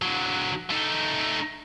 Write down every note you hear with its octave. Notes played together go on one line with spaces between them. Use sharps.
D3 F#3
A3 D#4